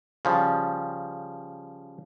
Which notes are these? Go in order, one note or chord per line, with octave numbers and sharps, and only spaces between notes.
C#3 F3 G3